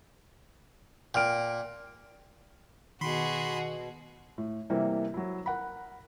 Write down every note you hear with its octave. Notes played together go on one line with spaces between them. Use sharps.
A#2 G5 F6 D7
B2 D#3 F#4 G#4 B5 C6
A2
C3 E3 G3 A#3 C4
F#3 E4
A#4 F#5 B5